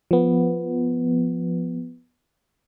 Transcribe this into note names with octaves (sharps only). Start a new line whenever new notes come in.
F3 B3